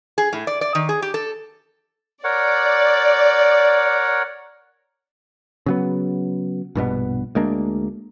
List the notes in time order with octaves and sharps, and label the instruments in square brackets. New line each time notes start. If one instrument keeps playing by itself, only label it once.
[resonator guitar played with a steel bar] G#4
A2
D5
D5
D#3
G#4
G4
A4
[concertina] A#4 C#5 F#5 [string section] D5
[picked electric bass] C#3 F#3 B3
A#1 G2 B2 B3
D2 G#3 A#3 D4